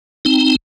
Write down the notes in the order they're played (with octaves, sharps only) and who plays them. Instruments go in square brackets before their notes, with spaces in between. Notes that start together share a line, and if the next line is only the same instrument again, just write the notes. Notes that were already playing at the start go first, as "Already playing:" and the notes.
[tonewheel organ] C4 D#4